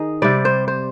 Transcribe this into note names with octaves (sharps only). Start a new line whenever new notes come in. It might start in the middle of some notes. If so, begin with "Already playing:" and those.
Already playing: D#3 D#4 G#4 D#5
C3 G3 D5
C5
C5